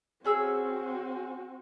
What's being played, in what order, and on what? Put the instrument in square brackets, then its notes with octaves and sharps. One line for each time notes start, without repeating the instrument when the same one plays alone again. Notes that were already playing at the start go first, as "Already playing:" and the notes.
[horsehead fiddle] C4 F#4 [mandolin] C#4 G#4 E6